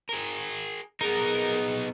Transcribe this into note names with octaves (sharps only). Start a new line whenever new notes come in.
G#4 A#4
B3 D#4 G#4 A#4